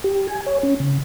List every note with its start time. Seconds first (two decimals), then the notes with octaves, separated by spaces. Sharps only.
0.04 G4
0.28 G#5
0.46 C#5
0.63 C#4
0.80 C#3